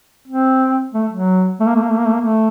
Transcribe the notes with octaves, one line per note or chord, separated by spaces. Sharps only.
C4
A3
F#3
A3
A#3
A3
A#3
A3
A#3
A3
A#3
A3